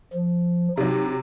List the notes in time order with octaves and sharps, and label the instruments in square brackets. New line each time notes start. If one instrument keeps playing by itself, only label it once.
[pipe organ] F3
[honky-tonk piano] C3 F#3 [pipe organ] D#4